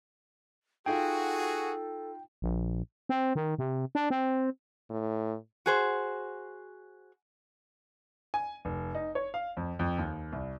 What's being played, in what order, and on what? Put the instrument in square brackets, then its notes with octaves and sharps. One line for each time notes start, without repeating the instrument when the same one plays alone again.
[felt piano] D#4 F4 [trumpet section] F#4 G#4 [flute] A4 [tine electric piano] G5
[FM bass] A#1
C4
D#3
C3
D4
C4
[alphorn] A2
[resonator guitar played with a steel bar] F#4 G#4 C5
[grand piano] G#5
F1
D#4
C#5
F5
F2
F2
D#2
C2